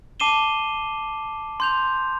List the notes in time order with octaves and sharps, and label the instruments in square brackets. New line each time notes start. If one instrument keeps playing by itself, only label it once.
[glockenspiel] A5 D6 C7 D#7 E7 G7
C6 G6 F7